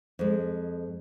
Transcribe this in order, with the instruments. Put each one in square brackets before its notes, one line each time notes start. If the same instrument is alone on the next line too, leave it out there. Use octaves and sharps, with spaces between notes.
[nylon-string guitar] F2 G#3